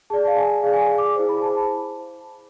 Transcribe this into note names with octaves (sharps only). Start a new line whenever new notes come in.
G#4 D5 A5
F5
G#5
G#4 D5 F5
G#5
F5
D6
E4 G#4 C5
B5
A5